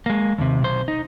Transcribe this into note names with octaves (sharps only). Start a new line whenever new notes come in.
G#3 A#3
D#2 C3
B1 C5
D#4